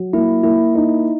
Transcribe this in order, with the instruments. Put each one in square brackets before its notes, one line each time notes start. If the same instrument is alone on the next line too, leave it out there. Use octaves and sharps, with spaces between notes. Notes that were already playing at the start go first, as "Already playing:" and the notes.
Already playing: [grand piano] F#3
[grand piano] A#3 [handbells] E4
[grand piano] A#3 [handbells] E4
[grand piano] D#4 [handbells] E4